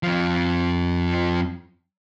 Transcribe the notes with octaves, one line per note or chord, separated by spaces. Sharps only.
F2 F3